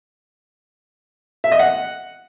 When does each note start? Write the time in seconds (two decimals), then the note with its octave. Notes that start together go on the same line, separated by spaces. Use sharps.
1.44 E5
1.52 D#5
1.59 F#5